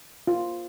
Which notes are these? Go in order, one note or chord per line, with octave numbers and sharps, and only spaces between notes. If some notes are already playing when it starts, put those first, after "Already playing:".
F4